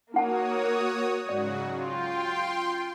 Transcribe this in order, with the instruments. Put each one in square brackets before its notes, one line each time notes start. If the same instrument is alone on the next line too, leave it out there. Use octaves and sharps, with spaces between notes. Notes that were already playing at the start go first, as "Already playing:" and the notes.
[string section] A#3 [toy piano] D#4 F#5 A5 [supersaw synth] F#4 C#5 D#6
[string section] G#2 [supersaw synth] C#3 F#3 F#4 [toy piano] D5
[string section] F4 [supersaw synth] G5 C6